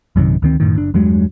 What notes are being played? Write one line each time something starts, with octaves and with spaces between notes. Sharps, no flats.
A#1 F#2 C3 D#3
D2 D#3 C4
F#2 A2 D#3
F#1 D4
E2 G2 F#3 G#3